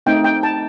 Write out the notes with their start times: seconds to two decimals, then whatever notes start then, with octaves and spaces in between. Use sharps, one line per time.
0.06 A3 C4 D#4 G5
0.24 G5
0.43 A5